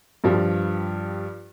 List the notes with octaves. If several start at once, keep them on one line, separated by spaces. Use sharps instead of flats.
G2 F3 G3